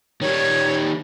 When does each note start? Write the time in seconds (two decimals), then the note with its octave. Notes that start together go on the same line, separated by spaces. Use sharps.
0.21 D#3 G3 C#5